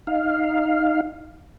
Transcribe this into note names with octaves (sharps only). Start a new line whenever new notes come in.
D#4 F5